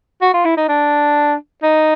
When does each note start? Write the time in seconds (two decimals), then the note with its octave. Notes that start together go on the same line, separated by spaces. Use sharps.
0.22 F#4
0.34 F4
0.45 E4
0.57 D#4
0.69 D4
1.63 D#4